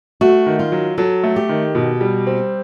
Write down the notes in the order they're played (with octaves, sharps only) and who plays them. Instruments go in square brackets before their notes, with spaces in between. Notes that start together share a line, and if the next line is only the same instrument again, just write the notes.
[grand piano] A3 [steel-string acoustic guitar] F#4
[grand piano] D#3
[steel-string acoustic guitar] F4
[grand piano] F#3
[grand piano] F#3 [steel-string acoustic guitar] A4
[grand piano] A3
[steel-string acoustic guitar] G4
[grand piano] D#3
B2
G3
C4